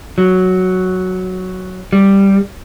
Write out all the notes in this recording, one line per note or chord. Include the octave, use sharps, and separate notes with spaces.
F#3
G3